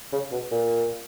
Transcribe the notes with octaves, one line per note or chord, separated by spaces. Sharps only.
C#3
B2
A#2